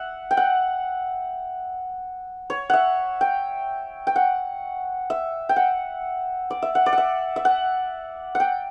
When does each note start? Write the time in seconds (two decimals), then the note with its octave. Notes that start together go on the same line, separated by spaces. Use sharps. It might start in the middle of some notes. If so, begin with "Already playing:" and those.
Already playing: E5 F#5
0.31 G5
0.37 F#5
2.50 C#5
2.70 E5 F#5
3.21 G5
4.07 G5
4.16 F#5
5.10 E5
5.49 G5
5.56 F#5
6.50 D5
6.62 E5
6.75 F#5
6.86 D5
6.93 F#5
6.98 E5
7.36 E5
7.45 F#5
8.35 F#5 G5